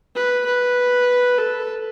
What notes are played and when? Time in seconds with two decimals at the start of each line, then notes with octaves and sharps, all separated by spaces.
0.16 B4
0.46 B4
1.38 A4